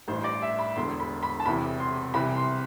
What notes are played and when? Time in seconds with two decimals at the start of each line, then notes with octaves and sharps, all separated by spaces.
0.08 A1 G2 E3 C5
0.24 D5
0.42 E5
0.59 B5
0.76 E1 E2 D3 C6
1.00 B5
1.23 B5
1.40 A5
1.45 E1 E2 C3 E3 B5
1.80 C6
2.14 C2 C3 E3 B5
2.36 C6